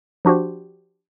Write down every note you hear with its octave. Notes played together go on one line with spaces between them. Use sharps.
F3 D4 F#4 G4 C5